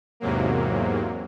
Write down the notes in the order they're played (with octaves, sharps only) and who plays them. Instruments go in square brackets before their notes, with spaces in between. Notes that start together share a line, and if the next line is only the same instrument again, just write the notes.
[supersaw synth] E2 G#2 C3 F#3 A#3